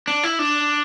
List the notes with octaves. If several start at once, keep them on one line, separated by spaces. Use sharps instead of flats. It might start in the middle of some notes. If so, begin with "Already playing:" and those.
D4
E4
D4